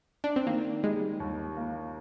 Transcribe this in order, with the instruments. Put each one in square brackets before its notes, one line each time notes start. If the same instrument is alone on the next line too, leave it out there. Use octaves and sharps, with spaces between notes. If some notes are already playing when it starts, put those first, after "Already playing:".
[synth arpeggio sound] D4
C4
[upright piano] D#3 [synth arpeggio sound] A#3
[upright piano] G3 [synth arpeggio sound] G#3
[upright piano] D#2
A#3